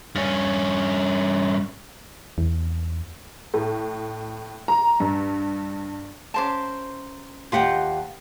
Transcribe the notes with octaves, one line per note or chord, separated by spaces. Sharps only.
G2 C#4
E2
A2
A#5
G2
C#4 A#4 C5 F5 A5 D6
D#2 F4 G4 F#5 G5